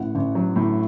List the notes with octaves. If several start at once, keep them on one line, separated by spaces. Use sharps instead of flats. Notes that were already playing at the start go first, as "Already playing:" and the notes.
Already playing: A1 A2 F#5
A1
F#3
A2